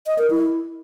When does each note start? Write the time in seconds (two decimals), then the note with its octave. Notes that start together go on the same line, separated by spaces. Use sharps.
0.07 D#5
0.18 A#4
0.30 E4